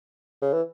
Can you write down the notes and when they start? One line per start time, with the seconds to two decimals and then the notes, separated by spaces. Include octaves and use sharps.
0.42 C#3
0.53 E3